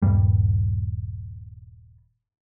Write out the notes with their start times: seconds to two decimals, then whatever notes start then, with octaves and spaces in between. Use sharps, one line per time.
0.02 D#1 G2 G3